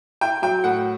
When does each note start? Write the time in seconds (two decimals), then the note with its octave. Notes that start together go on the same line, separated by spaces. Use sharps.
0.21 E4 G5
0.42 F#3 G5
0.64 A2 F#5